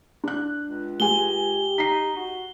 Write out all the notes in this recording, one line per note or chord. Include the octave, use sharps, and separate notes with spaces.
D4 F#6
C#2
G#3 G4 G#4 G#5 G7
D#4 B6 C7
F#4